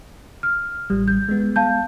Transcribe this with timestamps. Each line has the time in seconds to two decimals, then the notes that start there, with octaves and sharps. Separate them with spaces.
0.43 F6
0.90 A1 G3
1.08 G6
1.29 G#3 B3
1.56 F5 A5 G6